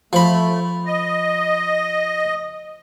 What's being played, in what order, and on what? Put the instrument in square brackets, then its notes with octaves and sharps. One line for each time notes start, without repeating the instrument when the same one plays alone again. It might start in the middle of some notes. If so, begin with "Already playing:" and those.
[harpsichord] F3 B5 [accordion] A3
[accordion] D#5